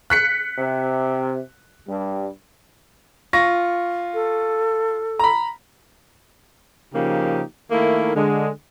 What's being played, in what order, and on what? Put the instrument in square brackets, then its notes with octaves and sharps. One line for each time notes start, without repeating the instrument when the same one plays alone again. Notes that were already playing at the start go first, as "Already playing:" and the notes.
[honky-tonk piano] F#6 B6 C#7
[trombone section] C3
G2 G3
[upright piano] F4 C#6 A#6
[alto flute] A4
[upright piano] A#5 B5
[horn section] C#3 F3 A#3 D#4 G4
D#3 A3 A#3 D#4 E4
D3 G#3